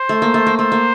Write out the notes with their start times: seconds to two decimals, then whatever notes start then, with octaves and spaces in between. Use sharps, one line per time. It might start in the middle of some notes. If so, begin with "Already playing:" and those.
Already playing: C5
0.09 A3
0.22 A#3
0.34 A3
0.46 A#3
0.57 A3 C5
0.72 A#3